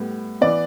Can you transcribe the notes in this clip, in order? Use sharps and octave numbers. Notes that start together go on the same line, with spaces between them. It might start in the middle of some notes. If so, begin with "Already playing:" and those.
Already playing: A2 G3 B3
E3 B3 D5